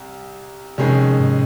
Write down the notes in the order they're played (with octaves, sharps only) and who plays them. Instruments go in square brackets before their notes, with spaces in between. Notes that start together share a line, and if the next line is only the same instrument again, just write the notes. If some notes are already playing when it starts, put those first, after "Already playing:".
Already playing: [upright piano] C2
[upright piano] F2 D#3 G#3 C#4 [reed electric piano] C3
[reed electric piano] G#2